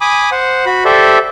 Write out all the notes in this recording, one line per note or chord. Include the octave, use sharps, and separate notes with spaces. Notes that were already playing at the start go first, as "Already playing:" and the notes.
G#5 B5 D6 D#6
C5 F#5
F#4 B5
G4 A4 C5 D5 E5